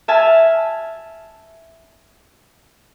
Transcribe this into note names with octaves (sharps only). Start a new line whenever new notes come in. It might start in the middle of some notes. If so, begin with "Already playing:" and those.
E5 G#5 A5 F6